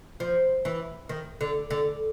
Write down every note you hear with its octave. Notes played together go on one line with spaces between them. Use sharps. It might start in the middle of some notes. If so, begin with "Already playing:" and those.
F3
E3
D#3
D3
D3